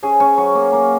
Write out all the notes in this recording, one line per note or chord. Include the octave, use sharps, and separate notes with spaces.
C#4 G#4
C#4 C#5
F#3 C#5
A#3
A#3